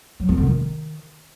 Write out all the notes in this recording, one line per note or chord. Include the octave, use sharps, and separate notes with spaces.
F#3
C4
D3
D#3